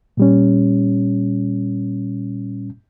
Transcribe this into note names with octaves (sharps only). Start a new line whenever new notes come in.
A#2 G3 C#4